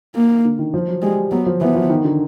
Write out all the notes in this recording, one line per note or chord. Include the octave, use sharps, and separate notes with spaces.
A#3
D3
D#3
F3
F#3
G3 G#3
F#3 B3
F3
E3 B3
F3
D#3
D3